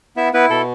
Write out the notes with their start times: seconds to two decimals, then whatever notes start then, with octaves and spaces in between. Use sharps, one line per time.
0.17 B3 E4 E5
0.33 B3 E4 B4
0.50 B2 A4